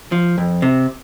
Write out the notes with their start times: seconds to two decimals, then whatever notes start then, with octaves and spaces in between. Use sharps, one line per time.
0.12 F3
0.38 F2
0.62 C3